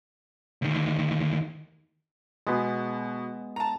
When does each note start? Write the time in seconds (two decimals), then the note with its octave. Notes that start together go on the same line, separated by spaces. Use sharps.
0.62 D2 D#3
2.47 B2 G#3 B3 G#4
3.56 A5 A#5